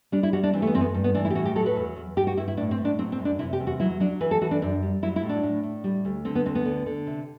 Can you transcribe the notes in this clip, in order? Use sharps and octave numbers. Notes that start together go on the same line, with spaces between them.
G3 D4
E4
G3 F#4
D4
E3 C4
A3
B3
F#2 C4
B3
G2
B3
E3 D4
E4
G4
A2 F#4
G4
F#3 A4
B4
E2
E2
G2 G4
F#4
G2 E4
E4
A2 D4
C4
A2
D4
F#3 C4
C4
F#2
D4
C3 E4
G4
E2
F#4
F#3 E4
F#3 D4
E3 B4
A4
E3 F#4
D4
F#2 D4
G3
F#3 E4
E4
A2
D4
A2
A2
G3
D2
D3 C4
B3
D2 C4
B3
D3
D3
C3